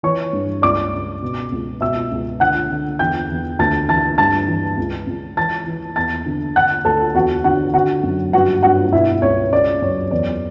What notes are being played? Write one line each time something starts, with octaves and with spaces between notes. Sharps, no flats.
E3 C#5 C#6
G2
C#2 D5 D6
C#3
B2
C#2
B2 E5 E6
C#2
D3 F#5 F#6
D3
E2 G5 G6
E2
D2 A5 A6
E3 A5 A6
G2 A5 A6
E3
C#2
C#2
E3 A5 A6
E3
E2 A5 A6
D3
D3 F#5 F#6
D2 A4 A5
E2 F#4 F#5
D3 F#4 F#5
D3 F#4 F#5
F#2
G2 F#4 F#5
G2 F#4 F#5
B2 E4 E5
C#2 C#5
C#3 D5
F#2 C#5
E2 D5